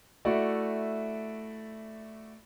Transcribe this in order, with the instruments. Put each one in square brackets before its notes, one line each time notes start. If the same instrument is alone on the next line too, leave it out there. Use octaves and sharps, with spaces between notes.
[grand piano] A3 E4 F#4 D5